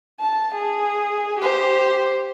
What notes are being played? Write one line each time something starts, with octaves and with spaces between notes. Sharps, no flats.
A5
G#4
G4 C5